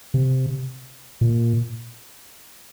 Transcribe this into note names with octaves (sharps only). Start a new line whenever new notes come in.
C3
A#2